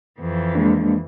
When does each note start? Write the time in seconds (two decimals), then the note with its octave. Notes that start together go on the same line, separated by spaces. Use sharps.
0.20 F2 E3
0.55 G#3 A#3 D4